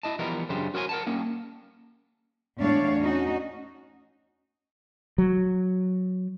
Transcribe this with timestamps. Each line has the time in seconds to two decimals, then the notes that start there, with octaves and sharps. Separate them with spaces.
0.03 E4 D#5 A5
0.19 E3 F3 G3 B3 F4 A#4
0.49 F#2 C#3 D4 G4 C5
0.74 F#4 A#4 C5 C#5 E5 G#5
0.89 A#4 F#5 A5
1.06 G3 A#3 C#4
2.59 E2 A2 D4 C#5 D5 F5
3.01 C#4 D#4 F#4
5.18 F#3